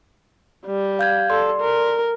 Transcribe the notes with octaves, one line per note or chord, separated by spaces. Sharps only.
G3
F5 G6 G#6
A4 D5 C6
A#4